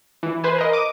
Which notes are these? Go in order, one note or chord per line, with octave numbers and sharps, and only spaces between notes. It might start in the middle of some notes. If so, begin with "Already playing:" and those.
E3
B4 C5 G#5
A#4 D#5
D6 D#7